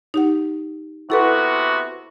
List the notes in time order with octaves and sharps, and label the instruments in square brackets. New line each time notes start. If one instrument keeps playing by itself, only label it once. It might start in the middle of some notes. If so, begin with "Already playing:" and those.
[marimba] D#4 G4 F#5
[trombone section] C3 B3 F#4 [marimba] E4 A4 B4